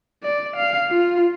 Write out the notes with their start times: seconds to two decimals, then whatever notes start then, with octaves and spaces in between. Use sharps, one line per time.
0.23 D5
0.56 F5
0.90 F4